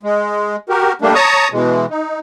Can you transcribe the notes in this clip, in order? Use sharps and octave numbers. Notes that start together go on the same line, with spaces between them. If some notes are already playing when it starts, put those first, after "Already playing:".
G#3
F#4 G4 A#4
G3 A3 A#3 D4
C#5 A5 A#5 C#6 D#6
B2 E3 G#3
D#4